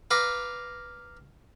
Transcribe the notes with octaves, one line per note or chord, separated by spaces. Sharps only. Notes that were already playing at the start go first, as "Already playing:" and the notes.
B4 F5 A#5 D6